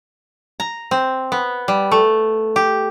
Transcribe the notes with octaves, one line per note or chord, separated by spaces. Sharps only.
A#5
C4
B3
G3
A3
G4